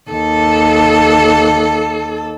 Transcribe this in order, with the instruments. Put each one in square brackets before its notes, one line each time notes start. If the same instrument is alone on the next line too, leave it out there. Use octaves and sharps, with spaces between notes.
[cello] D#2 A4